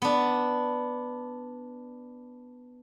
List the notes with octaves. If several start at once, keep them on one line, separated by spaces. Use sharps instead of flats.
B3 D4